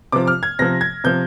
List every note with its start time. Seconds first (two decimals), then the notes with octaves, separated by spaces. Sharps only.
0.12 C3 F3 D6
0.27 F6
0.43 G#6
0.59 C3 F3 A#6
0.81 G#6
1.04 C3 F3 G6